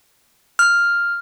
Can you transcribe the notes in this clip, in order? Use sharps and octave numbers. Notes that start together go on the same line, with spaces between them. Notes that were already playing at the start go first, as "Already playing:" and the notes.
F6